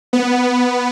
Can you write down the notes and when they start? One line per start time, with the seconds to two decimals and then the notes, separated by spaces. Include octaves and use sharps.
0.13 B3